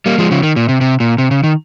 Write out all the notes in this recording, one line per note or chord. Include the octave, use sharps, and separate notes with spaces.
G3 A#3
F3 G#3
C#3 F3
D#3
A#2
C3
C3
A#2
C3
C#3
D#3